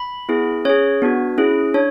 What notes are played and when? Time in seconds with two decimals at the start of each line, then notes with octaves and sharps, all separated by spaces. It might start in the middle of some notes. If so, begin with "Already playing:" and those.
Already playing: B5
0.29 B3 E4 G#4
0.65 C#4 G#4 C#5
1.02 B3 D4 F#4
1.38 C#4 E4 G#4
1.74 D4 C#5